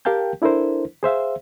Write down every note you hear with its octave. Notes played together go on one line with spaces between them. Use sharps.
G4 A#4 F5 G5 A5 G6
D4 E4 A4 A#4 C5
G#4 C5 E5 F5